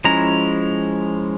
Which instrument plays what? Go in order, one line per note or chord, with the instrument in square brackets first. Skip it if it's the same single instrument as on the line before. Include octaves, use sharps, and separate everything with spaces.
[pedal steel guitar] F3 G#3 C#4 E4 A#5